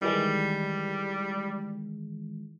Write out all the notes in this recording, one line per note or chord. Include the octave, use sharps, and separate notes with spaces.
D#3 E3 G3 G#3